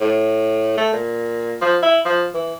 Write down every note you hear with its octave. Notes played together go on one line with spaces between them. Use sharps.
A2
A3
A#2
F3
E4
F3
E3